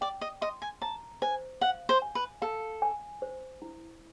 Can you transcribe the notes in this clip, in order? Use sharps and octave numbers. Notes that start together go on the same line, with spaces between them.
D5 G5
D#5
D#5 C6
G#5
A5 A#5
C5 G#5
F5 F#5
C5
G#5
B4
A4 F5
G#5
C5
E4